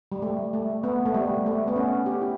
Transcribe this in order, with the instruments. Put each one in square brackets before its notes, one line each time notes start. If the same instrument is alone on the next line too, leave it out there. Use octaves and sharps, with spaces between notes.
[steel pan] G3
A3
A3
B3
A3
G3
A3
B3
C#4
G4
E4